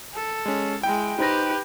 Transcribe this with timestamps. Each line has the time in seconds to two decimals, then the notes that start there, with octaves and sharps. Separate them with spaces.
0.14 A4
0.46 G#3 C#4
0.83 G#3 E4 G5
1.19 D#4 G4 B4 C5 A#6